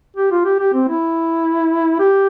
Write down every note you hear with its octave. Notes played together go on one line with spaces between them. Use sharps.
G4
F4
G4
G4
C4
E4
G4